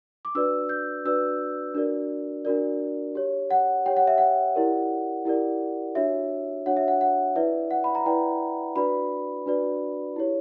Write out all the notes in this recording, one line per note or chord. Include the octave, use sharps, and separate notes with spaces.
D6
D4 F#4 B4 D5 E6
G6
D4 F#4 B4 D5 E6
D4 F#4 A#4 D5
D4 F#4 A#4 D5
G4 C#5
F#5
G4 C#5 G5
F#5
E5
F#5
E4 G4 A#4 D5
E4 G4 A#4 D5
D4 F#4 C#5 E5
D4 F#4 C#5 F#5
E5
F#5
F#5
E4 B4 D5 E5
F#5
B5
A#5
E4 B4 D5 G5
D4 F#4 B4 D5 B5
D4 F#4 B4 D5
E4 G4 C#5